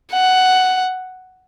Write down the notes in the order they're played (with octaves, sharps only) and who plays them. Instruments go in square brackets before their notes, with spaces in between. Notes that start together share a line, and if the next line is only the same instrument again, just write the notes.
[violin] F#5